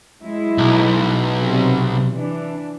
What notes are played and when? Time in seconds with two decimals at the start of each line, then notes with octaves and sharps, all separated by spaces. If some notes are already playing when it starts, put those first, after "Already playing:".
0.21 F#3 G#3 E4
0.58 B1
1.39 C3 F#3
2.12 E3 D4